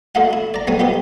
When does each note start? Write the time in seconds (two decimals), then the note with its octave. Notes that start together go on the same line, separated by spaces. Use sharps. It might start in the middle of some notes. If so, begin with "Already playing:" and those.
0.15 A3 D#4 F#4 F5 F#5
0.33 E4
0.54 D5 A#5
0.67 B1 G3 A3 C#5 G#5
0.79 F3 B3 D#4 G4